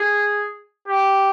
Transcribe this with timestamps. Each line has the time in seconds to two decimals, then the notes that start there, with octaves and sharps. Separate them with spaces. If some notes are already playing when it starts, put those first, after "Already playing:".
Already playing: G#4
0.88 G4